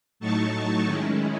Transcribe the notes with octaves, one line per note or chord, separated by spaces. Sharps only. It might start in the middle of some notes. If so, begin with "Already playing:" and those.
A2 F#3 A3 D#4 A5 C#6
D#3 G#3 C#4 E4